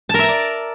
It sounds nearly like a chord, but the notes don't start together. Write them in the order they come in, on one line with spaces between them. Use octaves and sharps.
A5 A#4 E5 A#5 D5